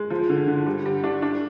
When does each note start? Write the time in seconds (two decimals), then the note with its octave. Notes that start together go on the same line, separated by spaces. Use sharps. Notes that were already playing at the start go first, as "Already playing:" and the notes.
Already playing: G#3
0.10 F3
0.29 D3
0.47 D3
0.66 G3
0.86 G3
1.04 D4
1.22 D4